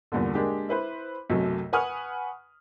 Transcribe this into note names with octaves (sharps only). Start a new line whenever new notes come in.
E2 G2 A#2 D3
G#3 A#3 D4 G4 G#4
E4 B4 C5
B1 F#2 C3 F#3 A3
B4 F#5 G#5 C#6 D#6 F6